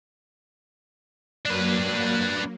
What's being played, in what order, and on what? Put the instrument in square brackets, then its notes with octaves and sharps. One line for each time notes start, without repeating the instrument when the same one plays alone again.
[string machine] F#3 A#3 [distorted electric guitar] D4 B4